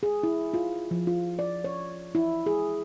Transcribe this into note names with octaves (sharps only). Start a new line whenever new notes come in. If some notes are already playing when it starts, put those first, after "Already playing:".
G#4
E4
F4
F3
F4
D5
C#5
E4
G#4